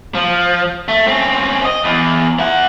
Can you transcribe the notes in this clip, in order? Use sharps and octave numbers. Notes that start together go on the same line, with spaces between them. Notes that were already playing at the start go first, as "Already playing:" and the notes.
F3
A3
C4 C#4
D#5
E2
E4 F#5